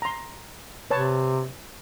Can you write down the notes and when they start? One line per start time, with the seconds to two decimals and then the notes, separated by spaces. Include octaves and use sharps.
0.02 A#5 C6
0.91 C3 B4 C#5 A5